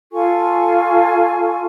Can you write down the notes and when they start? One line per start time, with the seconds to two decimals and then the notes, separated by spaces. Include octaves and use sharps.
0.13 F4 A4 G#5 C#6